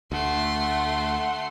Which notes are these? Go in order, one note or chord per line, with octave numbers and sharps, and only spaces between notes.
D2 A3 F#5 C6